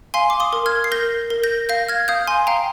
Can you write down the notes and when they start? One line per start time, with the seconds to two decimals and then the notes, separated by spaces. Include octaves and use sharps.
0.14 F5 G#5 C6
0.30 D6
0.40 C6 D#6
0.53 A#4
0.66 F6 G#6
0.84 C7
0.92 A#4 G6 A#6
1.30 A#4
1.43 G6 A#6
1.69 F5 G6 A#6
1.89 F6 G#6
2.08 F5 D#6 G6
2.27 G#5 C6
2.47 F5 G5 A#5